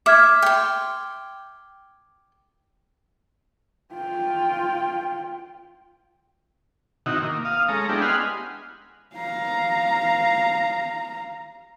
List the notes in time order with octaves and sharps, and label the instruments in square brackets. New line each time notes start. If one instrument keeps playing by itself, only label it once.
[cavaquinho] E5 [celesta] D6 F6 G#6
[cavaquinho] G5 C6
[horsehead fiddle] F4 G5
[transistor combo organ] C3 D#3 D#4 E4 F#4
A#3
F5 D#6
G#3 C#4 A4 A#5
G#3 B3 D4 E4 G4
D#5 F#5 G#5 B5 C6 F6
[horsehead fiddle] F5 A#5